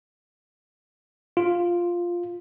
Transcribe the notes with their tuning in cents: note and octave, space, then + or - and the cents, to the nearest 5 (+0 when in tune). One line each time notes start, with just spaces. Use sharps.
F4 +0